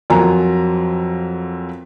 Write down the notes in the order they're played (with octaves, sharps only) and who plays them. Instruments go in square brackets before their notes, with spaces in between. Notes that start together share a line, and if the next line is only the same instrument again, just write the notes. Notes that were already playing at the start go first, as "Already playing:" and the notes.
[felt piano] F2 F#3 F4 A#4 G#5 A#5